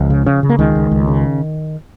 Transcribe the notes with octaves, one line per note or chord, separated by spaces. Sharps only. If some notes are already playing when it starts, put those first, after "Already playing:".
Already playing: C#2 F3
C#3
C#3
C#3
A#3
C#2 D#3 G#3
C#2
C#2
C#3